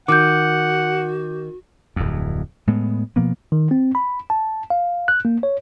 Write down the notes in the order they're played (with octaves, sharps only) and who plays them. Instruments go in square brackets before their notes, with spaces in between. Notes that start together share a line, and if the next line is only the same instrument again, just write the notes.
[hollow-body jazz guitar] D#3 [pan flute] F#4 [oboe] F#5 [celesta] D6 G6
[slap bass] D1 F2
A2 G#3 B3
B2 F3 A#3 B3
[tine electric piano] D#3
C4
B5
A5
F5
F#6
A#3
C#5